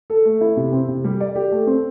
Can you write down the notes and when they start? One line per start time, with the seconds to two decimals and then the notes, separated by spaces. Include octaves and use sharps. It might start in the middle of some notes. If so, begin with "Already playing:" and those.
0.10 A4
0.25 A3
0.41 E4
0.57 C3
0.73 C4
0.88 C3
1.04 G3
1.20 D5
1.36 G4
1.52 A3
1.67 C4